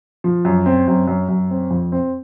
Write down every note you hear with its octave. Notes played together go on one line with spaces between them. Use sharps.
F3
F#2
C4
F#2
F#2
F#2
C4
F2
C4